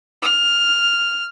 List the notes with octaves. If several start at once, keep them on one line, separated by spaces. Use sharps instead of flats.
F6